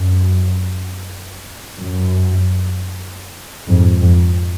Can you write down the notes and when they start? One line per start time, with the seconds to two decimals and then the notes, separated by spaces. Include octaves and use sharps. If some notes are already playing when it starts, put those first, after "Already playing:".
Already playing: F#2
1.80 F#2
3.68 F2 G#2
4.00 F2